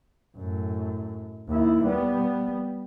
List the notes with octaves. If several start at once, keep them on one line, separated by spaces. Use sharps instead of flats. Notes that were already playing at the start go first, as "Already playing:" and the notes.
F#2 A2
D#2 E4
G3 B3